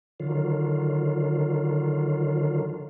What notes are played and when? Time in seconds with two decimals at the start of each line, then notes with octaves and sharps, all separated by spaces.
0.20 D3 D#3 F#3 F4